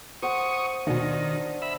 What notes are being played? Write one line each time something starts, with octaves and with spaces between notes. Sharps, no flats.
C5 F#5 C#6 D#6
D#2 B2 D#3 D4
E5 B5